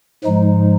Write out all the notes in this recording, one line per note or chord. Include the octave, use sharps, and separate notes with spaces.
G#2 F3 G#3 D#4